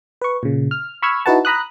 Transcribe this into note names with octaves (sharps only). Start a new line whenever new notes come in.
B4 C#6
A#2 C#3
F6
B5 C#6 E6 F6 G#6
D#4 E4 F#4 B4 F#5 A5
A#5 B5 D#6 F#6